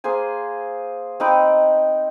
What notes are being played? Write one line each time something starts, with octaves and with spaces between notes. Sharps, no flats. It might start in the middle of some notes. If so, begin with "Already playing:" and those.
A#3 G#4 C5 G#5
C4 D#4 B4 G5